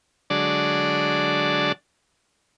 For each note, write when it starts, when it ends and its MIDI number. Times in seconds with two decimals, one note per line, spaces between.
0.30 1.72 50
0.30 1.72 54
0.30 1.72 56
0.30 1.72 62
0.30 1.72 74
0.30 1.72 81